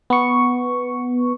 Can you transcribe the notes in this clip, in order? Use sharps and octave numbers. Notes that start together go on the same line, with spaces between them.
B3 C#6